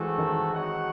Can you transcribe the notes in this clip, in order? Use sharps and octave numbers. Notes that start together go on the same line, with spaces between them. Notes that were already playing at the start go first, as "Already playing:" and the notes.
Already playing: E3 G#3 A3 C4 F#4 A4
D#3
C4 D#4 F#4 C#5 F#5